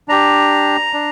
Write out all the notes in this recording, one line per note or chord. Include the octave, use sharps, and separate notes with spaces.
D4 G4 A#5
D4